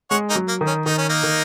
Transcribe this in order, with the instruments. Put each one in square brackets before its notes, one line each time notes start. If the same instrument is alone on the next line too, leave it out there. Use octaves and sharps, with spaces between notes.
[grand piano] G#3 [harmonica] C#5 F#5
[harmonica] A#3 D#4
[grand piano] F#3
[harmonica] A#3
[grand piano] D#3
[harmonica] C#4
[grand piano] D#3 [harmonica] D#4
[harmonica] C#4
A#3 D#4
[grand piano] D#3